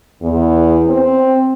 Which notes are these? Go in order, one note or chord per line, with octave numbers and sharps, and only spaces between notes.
E2
C4